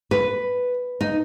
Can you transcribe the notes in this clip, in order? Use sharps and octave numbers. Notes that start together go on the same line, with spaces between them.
B4
D#4